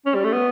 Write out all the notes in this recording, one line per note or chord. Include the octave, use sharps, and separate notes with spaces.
C#4
G3
A3
B3